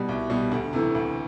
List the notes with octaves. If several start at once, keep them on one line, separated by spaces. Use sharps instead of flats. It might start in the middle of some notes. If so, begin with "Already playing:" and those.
Already playing: B2 G3
C2
B2 G3
D2
C3 E3 A3
D2